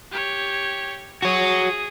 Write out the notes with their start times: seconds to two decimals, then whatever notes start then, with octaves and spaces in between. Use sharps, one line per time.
0.11 G4 C#5
1.22 F#4 G#4 C#5 D#6